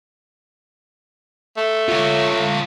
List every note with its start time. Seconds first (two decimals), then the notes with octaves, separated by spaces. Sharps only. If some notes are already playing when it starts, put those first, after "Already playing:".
1.57 A3
1.89 F4 C#5